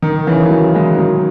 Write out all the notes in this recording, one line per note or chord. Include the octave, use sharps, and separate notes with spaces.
D#3
C#3 E3
D#3 F#3
E3 G#3
D#3 F#3